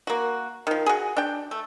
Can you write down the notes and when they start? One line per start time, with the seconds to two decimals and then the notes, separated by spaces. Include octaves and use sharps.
0.07 A#3 F#4
0.67 D#3 F3
0.86 F#4 G#4
1.17 D4 G5
1.51 A3